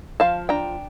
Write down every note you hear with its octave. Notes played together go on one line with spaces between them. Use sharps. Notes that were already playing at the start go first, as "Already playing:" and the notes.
F3 F5 A5
D4 G5 A#5